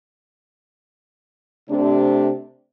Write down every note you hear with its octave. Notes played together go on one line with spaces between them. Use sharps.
C3 A3 D4